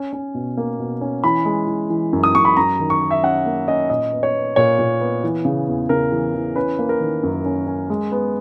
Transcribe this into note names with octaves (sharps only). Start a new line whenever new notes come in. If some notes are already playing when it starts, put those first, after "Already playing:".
Already playing: C#4
C#4
B2
A#3
B2
C#4
E3 B5
G#3
E3
E3
F#2
D#6
F#2 C#6
B5
F#2 A#5
D#3
C#6
D#3
E5
C#4 F#5
A#3
C#4 D#5
A#2 D#5
B3
C#5
B3
A#2 C#5
A#2
B3
E3
C#3
E2
C#3 A#4
E3
E3
C#4 B4
A#3
A#4
D#3
F#2
C#4
C#4
G#3
B3